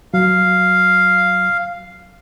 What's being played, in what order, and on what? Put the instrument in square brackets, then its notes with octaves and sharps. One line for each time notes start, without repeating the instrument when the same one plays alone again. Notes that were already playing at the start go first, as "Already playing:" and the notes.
[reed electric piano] F#3 [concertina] F5